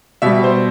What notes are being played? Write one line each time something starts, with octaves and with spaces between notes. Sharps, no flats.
B2 G3 E5
C5